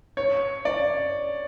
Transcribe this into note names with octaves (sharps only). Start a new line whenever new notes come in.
C#5
D5